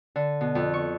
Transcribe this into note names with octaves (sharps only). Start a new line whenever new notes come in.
D3
B2
F2
C#6